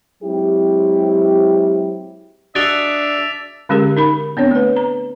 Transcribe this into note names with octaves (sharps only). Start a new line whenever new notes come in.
F#3 G#3 C4 E4 G4
D4 F#4 G#4 D#5 E5 A6 D7 F7
D3 G#3 C#4 G4 G#4 A#4
D#4 A#4 B5
B3 C4 D4 C#5
A3 B4
A#5